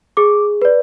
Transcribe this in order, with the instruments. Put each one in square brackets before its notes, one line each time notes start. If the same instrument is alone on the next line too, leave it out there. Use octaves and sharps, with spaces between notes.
[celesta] G#4 D6
B4 D5